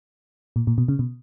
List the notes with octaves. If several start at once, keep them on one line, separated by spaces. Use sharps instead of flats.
A#2
A#2
B2
C#3
B2